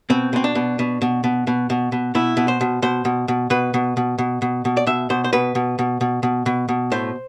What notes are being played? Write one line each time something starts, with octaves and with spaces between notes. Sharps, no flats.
B2 C4
B2 C4
D4
B2
B2
B2
B2
B2
B2
B2
B2 E4
B2
C5
B2
B2 C5
B2
B2
B2 B4
B2
B2
B2
B2
B2
D5
B2 E5
B2 C5
C5
B2 B4
B2
B2
B2
B2
B2
B2
A2 C5